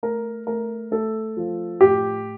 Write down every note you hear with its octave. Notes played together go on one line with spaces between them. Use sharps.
A3 A#4
A3 A#4
A3 A4
F3
A2 G4